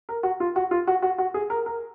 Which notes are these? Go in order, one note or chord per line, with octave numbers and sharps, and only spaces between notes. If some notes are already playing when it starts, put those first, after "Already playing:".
A#4
F#4
F4
F#4
F4
F#4
F#4
F#4
G#4
A#4
A#4